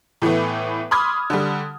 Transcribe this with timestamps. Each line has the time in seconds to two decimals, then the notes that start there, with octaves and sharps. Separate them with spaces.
0.22 A2 E3 A3 B3
0.91 B5 C6 D6 D#6 F6 G#6
1.30 D3 G3